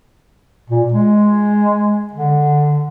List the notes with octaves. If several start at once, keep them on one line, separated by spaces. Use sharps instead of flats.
A#2
G#3
D3